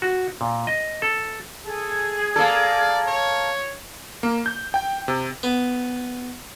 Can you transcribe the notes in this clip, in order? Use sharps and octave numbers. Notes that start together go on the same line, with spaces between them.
F#4
A#2
D#5
A4
G#4 A4
A#3 A4 D5
C#5
A#3
G6
G5
C3
B3